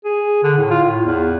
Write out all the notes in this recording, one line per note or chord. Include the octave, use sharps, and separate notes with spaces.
G#4
D3
A2
F4
A2
E2